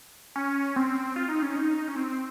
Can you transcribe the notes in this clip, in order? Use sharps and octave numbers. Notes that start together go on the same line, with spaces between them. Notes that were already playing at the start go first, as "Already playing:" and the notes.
C#4
C4
F4
D#4
C#4
D#4
C#4
C4